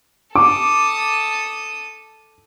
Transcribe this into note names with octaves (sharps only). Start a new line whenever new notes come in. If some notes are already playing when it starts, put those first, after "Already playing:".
A4 D6 D#6